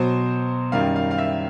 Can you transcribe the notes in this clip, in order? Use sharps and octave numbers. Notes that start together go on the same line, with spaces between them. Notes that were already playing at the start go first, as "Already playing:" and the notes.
Already playing: B2 F#3 C5
F#2 D#3 G3 F5
F5
F5
E5